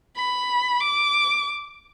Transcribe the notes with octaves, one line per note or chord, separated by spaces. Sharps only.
B5
D6